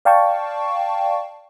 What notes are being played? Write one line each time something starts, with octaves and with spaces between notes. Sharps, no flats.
D5 F5 G5 A5 C#6